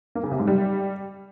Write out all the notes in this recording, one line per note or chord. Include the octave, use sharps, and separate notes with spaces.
A#3
C#3
C3
G#2
G3